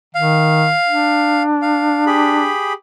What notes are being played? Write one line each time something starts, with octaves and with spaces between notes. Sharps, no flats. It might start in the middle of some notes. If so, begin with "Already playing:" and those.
D#3 F5
D4
F5
G4 G#4 B5